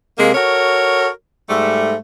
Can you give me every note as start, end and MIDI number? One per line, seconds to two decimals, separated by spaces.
0.18 0.32 48
0.18 0.32 56
0.18 0.32 58
0.34 1.08 66
0.34 1.08 69
0.34 1.08 70
0.34 1.08 73
1.49 1.96 44
1.49 1.96 55
1.49 1.96 57